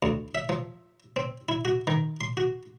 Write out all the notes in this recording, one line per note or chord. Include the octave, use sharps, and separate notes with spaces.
D2
E5
F3
C4
E4
F#4
D#3
C6
F#4